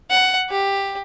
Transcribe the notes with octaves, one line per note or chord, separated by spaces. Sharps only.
F#5
G4